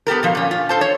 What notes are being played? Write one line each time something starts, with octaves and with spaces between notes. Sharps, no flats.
B3 G4 A4 A#4
B2 F3 F5
A#2 C#4
F4
A4 C5 A5
C#5